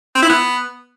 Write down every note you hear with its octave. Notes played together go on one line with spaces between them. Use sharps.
C4
E4
B3